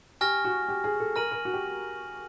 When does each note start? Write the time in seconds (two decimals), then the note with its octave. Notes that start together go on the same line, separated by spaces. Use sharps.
0.21 G4 G#5 C#6 F6 A#6
0.45 F#4
0.69 G4
0.84 G#4
1.00 A4
1.16 A#4 F6 A#6 D#7 F#7
1.31 A#4
1.45 F#4
1.54 G4